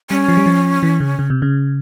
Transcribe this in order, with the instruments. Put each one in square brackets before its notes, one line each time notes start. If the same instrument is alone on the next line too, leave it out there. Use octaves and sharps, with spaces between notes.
[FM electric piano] G3 [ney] C#4
[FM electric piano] F3
G3
F3
E3
C#3
C#3
C3
C#3